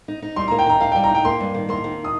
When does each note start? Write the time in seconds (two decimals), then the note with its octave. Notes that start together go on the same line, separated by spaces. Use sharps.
0.08 D#4
0.22 D#4
0.36 G3 C6
0.48 A#5
0.51 A#3
0.59 G5
0.66 D#3 A#5
0.80 A#3 F5
0.92 G5
0.96 G3
1.04 A#5
1.10 D#4 G5
1.25 A#3 C6
1.40 G2
1.54 D#3
1.69 A#3 C6
1.84 D#3
2.04 D#6